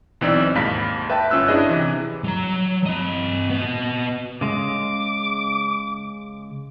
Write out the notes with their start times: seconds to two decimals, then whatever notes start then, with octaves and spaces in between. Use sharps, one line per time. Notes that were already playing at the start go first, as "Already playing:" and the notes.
0.21 B1 E3 C4 D#4 D5 E6
0.55 D#2 G#2 F5 B5 B6
1.10 B4 E5 G5 A5 B5
1.30 G1 C#4 F4 E6 F#6
1.48 C#4 D4 E4 G#4 D#5
1.69 C3 E3
2.24 F#3 A#5
2.86 C4 D#5
3.50 B3 D#5
4.41 C#3 G#3 D6